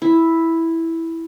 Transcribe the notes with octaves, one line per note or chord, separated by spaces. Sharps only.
E4